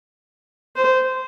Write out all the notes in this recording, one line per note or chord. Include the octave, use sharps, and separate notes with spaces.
C5